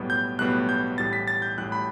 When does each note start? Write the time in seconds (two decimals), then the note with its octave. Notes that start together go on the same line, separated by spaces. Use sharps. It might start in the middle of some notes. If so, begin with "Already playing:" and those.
Already playing: B1 A2 G3 B3
0.10 G6
0.39 B1 A2 G3 B3 F#6
0.69 G6
0.98 A1 A2 G3 A6
1.13 B6
1.28 A6
1.42 G6
1.58 A1 A2 G3 F#6
1.72 B5